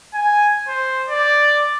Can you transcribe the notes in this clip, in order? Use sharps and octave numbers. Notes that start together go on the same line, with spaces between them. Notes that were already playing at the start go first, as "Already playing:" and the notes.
G#5
C5
D5